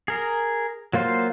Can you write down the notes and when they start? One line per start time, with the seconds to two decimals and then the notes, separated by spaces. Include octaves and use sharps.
0.08 G#4 A#4
0.93 F#3 A#3 F4 C5 F5